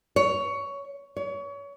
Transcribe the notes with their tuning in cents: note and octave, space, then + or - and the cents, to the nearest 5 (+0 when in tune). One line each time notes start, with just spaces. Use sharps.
C#5 +15
C#5 +30